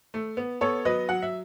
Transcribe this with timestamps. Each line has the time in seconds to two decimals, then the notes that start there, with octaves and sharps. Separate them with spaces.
0.14 A3
0.37 B3
0.61 B3 A4 C#5
0.85 F#3 B4 D#5
1.09 F#3 F#5
1.22 E5